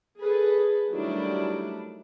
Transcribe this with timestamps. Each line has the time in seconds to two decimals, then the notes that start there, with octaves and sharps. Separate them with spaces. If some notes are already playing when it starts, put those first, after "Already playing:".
0.20 G#4 A4 B4
0.91 D#3 F#3 G3 A3 D4 E4